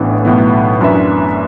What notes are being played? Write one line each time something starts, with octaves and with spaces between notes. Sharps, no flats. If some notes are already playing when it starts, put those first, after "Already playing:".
Already playing: A1 A2 E3 B3 D4
B1 A2 E3 B3
F#2 E3 D4 B4 E5